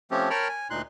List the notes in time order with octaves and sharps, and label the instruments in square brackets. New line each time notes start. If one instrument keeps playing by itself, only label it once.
[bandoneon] F3 A3 C4 C#4 G4
A#4 C#5 G5 A5 B5 F6
G#5
D2 A#2 D#4 C6 F#6